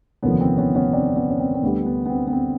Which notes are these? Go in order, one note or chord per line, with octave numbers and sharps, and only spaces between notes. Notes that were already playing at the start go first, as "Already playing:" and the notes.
F1 D#2 D3 F3 B3 C#4
C4
B3 C#4
B3 C#4
C4 D4
B3 C#4
C#4
C4
C4
D2 D3 G3 B3
B3
B3
C4
B3
C4